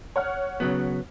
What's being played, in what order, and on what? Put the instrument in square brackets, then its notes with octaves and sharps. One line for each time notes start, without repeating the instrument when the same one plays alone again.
[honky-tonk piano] C#5 F#5 F6
[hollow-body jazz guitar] C#3 F#3 B3